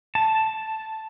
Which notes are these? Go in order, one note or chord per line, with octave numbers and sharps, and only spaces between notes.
A5